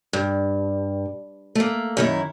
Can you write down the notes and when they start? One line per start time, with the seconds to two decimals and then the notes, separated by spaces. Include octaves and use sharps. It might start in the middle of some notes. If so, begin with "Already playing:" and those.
0.13 G2
1.55 A3 A#3
1.97 F#2 D#3 E4